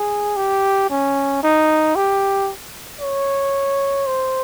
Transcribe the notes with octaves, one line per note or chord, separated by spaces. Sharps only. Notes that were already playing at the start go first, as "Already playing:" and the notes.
Already playing: G#4
G4
C#4
D#4
G4
C#5
C5